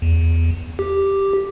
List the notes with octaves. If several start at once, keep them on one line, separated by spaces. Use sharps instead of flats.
E2
G4